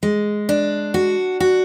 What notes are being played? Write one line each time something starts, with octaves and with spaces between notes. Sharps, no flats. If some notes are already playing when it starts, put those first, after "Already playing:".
G#3
D4
F#4
F#4